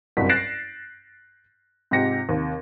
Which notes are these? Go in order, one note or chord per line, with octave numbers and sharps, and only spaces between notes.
F#1 C2 G2 C4 F#4 B6
F#6 A6 A#6 C7 D7 E7
G#2 C3 F4 G4 A#6 C#7
D#2 C3